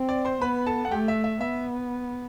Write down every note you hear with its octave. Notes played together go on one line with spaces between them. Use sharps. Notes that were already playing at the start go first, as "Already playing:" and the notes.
Already playing: C4
D5
C5 C6
B3 B4 B5
A4 A5
F#5
A3 G4 G5
E5
E5
B3 E5